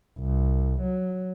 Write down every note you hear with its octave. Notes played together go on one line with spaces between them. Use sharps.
C2
F#3